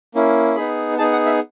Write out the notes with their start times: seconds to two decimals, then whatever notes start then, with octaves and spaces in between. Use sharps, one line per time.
0.15 A#3 C#4 E4
0.56 B3 D#4 G#4 B5
0.98 B3 D#4 G#4 A5
1.12 F#5
1.26 E5